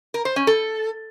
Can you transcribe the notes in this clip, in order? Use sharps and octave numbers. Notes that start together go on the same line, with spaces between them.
A#4
C5
C#4
A4